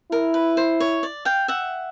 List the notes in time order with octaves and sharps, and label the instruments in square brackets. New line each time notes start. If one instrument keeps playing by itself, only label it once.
[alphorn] E4 [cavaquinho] A#4
[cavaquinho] B4
C5
C#5
D5
F5 G5
E5 F#5